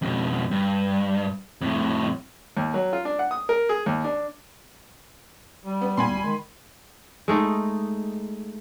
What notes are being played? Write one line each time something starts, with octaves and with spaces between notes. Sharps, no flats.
F2 B2
G2
F2 A2
D#2
F#3
F4
D4
F#5
D#6
A#4
G#4
D#2
D4
G3
B3
A#2 A#3 B3 G#5 B5 C6
D1
D#3 G#3
G#3 A3 D#4